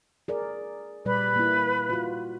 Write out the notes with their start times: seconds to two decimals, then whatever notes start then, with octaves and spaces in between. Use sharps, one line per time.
0.28 G#4 A#4 D5
1.05 A#2 G3 B4 D5 B5
1.36 A#3 E4
1.90 F4 F#4